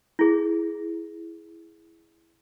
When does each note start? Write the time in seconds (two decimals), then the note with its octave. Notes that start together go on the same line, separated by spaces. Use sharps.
0.19 E4 G#4